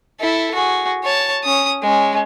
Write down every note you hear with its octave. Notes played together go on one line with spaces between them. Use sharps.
E4 A4
F#4 G#4
C#5 A5
C#4 D#6
G#3 C#4